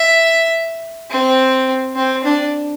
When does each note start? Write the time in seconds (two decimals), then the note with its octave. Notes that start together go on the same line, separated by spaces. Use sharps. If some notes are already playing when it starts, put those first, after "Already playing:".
Already playing: E5
1.11 C4
1.96 C4
2.24 D4